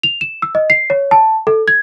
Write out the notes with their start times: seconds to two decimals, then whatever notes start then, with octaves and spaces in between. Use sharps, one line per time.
0.03 F7
0.21 E7
0.42 E6
0.55 D#5
0.70 C7
0.90 C#5
1.11 A5
1.47 A4
1.68 G#6